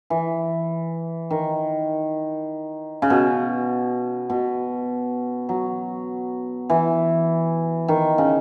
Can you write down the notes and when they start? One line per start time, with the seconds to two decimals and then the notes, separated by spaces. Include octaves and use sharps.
0.10 E3
1.30 D#3
3.02 C#3
3.10 B2
4.30 B2
5.49 F#3
6.70 E3
7.88 D#3
8.18 C#3